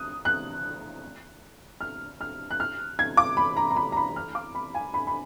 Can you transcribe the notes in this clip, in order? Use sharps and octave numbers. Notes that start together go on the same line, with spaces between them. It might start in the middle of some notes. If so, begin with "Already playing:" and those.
Already playing: D#6 F#6
F#6
F6
F6
F#6
F6
G#6
D6
B5
A#5
A#5
B5
A#5
B5
F6
D6
B5
G#5
B5
B5